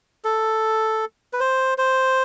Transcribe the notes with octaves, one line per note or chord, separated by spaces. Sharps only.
A4
B4
C5
C5